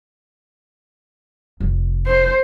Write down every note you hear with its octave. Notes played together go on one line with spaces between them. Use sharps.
F1
C5